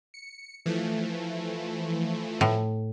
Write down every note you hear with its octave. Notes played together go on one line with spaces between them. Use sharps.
C#7
E3 F3 A3
A2